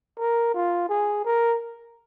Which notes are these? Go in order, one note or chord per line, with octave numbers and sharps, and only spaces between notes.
A#4
F4
G#4
A#4